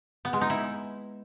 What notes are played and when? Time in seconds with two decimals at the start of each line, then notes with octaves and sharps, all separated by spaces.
0.25 B3
0.33 G#3
0.41 D#4
0.50 E4